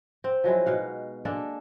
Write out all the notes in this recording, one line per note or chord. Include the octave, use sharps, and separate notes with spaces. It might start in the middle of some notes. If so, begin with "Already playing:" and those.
C4
F3 F#3 G#3 E4
B2 D#4 F5 F#5
G#3 A#3 D4 A4